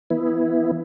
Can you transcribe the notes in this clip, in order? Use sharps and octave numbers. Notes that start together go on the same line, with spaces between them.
E3 B3 E4